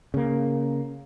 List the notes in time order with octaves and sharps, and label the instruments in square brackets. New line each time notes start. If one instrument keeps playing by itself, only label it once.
[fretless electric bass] C#3 A#3